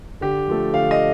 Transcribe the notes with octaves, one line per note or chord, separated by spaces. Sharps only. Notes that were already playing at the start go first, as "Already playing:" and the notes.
D3 G4
F3 A3
D3 F5
D#5